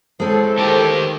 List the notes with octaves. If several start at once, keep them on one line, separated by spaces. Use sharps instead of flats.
A2 G#3 C4 A4 C5
D#3 G4